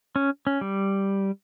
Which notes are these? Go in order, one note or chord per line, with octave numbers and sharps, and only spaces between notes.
C#4
C#4
G3